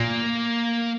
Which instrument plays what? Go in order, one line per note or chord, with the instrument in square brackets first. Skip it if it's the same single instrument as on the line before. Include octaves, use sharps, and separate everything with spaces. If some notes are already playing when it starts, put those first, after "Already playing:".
Already playing: [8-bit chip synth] A#2 [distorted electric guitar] A#3